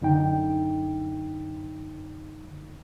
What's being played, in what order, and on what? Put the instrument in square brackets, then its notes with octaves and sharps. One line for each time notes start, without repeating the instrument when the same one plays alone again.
[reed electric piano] F#2 D3 D#4 G5